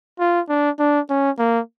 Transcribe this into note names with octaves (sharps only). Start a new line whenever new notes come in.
F4
D4
D4
C#4
A#3